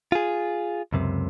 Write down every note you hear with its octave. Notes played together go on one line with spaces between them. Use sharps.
F4 G#4
C#2 F#2 C3